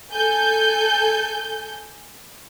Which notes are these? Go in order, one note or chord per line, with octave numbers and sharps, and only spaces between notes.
A4 G#5 G6